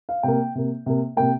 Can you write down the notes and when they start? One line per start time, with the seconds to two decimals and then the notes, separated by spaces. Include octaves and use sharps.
0.09 F5
0.23 C3 A#3 G5
0.55 C3 A#3
0.86 C3 A#3
1.17 C3 A#3 G5